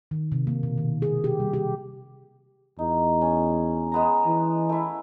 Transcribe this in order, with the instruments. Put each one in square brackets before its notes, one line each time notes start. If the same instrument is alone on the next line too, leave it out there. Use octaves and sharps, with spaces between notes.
[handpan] D#3
C3
A#3
B2
D#3
G#4
G4
G3
G4
[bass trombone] E2 [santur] D#4
[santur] C#4
G#3 B3 A#5
[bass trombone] E3
[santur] A3 E4